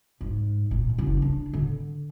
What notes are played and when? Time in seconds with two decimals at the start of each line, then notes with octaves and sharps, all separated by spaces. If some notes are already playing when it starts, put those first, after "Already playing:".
0.21 G#2
0.71 A#2
0.98 F#1
1.22 D4
1.53 D3